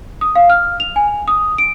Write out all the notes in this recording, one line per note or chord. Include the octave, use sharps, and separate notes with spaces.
D#6
F5
F6
F7
G#5
D#6
D7